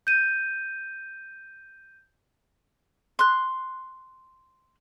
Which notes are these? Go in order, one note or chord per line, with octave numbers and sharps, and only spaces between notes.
G6 D#7
C6 F#6